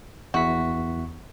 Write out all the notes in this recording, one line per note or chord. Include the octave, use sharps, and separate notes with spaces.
E2 E4 F#4 B6